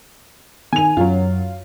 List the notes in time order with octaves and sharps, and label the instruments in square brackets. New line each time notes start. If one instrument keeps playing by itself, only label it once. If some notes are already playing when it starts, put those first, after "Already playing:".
[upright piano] D#3 F7 [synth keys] G#5
[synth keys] F#2 F#3 [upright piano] F4